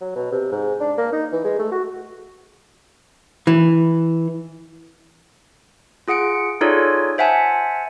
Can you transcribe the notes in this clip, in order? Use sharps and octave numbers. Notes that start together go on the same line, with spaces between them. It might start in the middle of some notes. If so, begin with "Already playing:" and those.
F#3
B2
C3
G#2
D4
A#3
D#4
E3
G#3
A3
F#4
E3
F4 G#4 F#5 C#7 D7
D#4 F4 G#4 A4 C#5 D5
C5 E5 F#5 G#5 A5